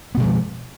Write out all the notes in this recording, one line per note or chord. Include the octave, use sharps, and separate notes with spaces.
B2 F3 G#3 B3